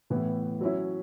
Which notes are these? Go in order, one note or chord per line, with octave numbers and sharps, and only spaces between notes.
A2 E3 B3
F#3 C#4 E4